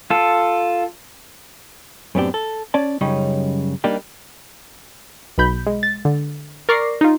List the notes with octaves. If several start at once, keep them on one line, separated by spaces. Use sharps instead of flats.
F4 A4
F#2 A2 B3 C4 D4 G4
A4
C#4 D5 A5
F#2 C#3 G3 C#4 D#4
G3 A#3 D4 D#4 G4
B1 B2 B5 G6
G#3
A6
D3
A#4 D5 C#6 D6 A#6 C7
D#4 F4